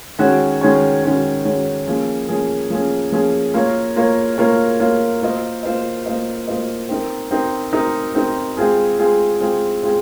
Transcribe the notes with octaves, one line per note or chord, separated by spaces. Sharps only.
D#3 G#3 C#4 F#4 C#5
D#3 G#3 C#4 F#4 C#5
D#3 G#3 C#4 F#4 C#5
D#3 G#3 C#4 F#4 C#5
F3 A#3 C#4 G#4
F3 A#3 C#4 G#4
F3 A#3 C#4 G#4
F3 A#3 C#4 G#4
A#3 F4 A#4 C#5
A#3 F4 A#4 C#5
A#3 F4 A#4 C#5
A#3 F4 A#4 C#5
A#3 F4 C5 D#5
A#3 F4 C5 D#5
A#3 F4 C5 D#5
A#3 F4 C5 D#5
C4 D#4 A#4
C4 D#4 A#4
C4 D#4 A#4
C4 D#4 A#4
G#3 C4 F4 G#4
G#3 C4 F4 G#4
G#3 C4 F4 G#4
G#3 C4 F4 G#4